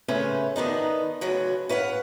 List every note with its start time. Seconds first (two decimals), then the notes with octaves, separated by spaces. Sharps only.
0.08 C#3 A3 C#4 B4 C5
0.56 D#3 B3 D4 D#4
1.21 D2 C#3 F#3 B4
1.69 C#4 B4 F5 F#5